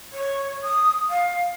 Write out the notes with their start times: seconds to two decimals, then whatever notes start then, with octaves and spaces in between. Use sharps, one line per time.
0.13 C#5
0.63 D#6
1.10 F5